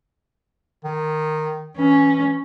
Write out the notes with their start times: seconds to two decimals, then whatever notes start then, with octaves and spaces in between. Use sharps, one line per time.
0.84 D#3
1.77 E3 C#4